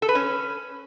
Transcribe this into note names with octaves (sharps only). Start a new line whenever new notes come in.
A4
B4
C#4